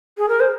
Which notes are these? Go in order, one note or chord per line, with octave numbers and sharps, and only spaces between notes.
G#4
A#4
C5